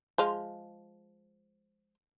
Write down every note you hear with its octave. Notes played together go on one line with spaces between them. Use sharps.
F3 G#3 F5